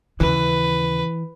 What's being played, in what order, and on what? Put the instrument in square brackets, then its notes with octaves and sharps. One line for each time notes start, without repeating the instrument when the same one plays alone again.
[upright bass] D#2 C#3 [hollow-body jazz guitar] E3 [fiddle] B4